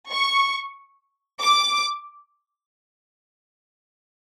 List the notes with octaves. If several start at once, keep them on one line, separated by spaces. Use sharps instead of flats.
C#6
D6